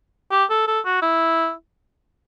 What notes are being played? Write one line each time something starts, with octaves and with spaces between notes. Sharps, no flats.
G4
A4
A4
F#4
E4